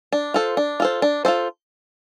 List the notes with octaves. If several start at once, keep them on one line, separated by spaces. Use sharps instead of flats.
D4
F4 A4 C5
D4
F4 A4 C5
D4
F4 A4 C5